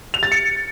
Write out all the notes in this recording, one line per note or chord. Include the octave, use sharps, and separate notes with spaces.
F7
A6
C#7